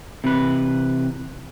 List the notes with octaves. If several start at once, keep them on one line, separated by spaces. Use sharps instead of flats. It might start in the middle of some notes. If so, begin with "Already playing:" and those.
C3 E3 B4